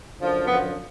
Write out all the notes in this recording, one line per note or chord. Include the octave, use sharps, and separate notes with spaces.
F#2 D3 F3
F#2 D3 F3 B3